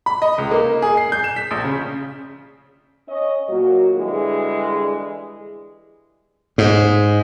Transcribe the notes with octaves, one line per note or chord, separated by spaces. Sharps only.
B5
D#5
C#2
A#3
G#4
C7
G6
E7
B6
A#1
C#3
C#4 D#5
A#2 F#3 A#3 F#4
D3 E3 G3 G#3 G#4
G#2